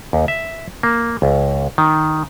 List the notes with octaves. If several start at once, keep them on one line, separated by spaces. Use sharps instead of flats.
D#2
E5
A#3
C#2
D#3